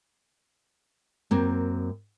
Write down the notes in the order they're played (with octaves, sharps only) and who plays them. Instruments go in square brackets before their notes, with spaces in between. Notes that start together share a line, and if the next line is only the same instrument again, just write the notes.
[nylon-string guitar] F#2 A#3 C4